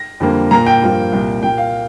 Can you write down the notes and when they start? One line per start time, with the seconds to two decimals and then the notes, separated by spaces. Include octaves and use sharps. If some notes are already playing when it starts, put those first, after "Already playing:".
Already playing: A#6
0.20 F2 D3 G3 A#3
0.51 A#2 A#3 A#5
0.66 G5
0.81 G2 F3 A#3
1.12 C2 A#2 A#3
1.42 A#2 A#3 G5
1.58 F5